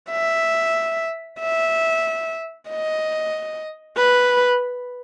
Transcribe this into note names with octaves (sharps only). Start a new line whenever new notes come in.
E5
E5
D#5
B4